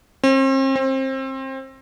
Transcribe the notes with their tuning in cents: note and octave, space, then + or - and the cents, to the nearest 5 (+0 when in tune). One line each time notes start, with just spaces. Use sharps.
C4 +40
C4 +25